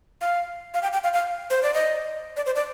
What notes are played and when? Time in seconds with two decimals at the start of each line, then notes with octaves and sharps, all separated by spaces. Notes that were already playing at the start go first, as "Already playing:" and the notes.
0.21 F5
0.74 F5
0.83 G5
0.93 G5
1.04 F5
1.14 F5
1.50 C5
1.63 D5
1.74 D#5
2.37 D5
2.46 C5
2.56 D5